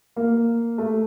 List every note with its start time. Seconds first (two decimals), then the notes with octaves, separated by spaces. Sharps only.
0.16 A#3
0.78 A3